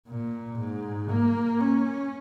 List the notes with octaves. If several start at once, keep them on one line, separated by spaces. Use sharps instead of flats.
A#2
G#2
A#3
C#4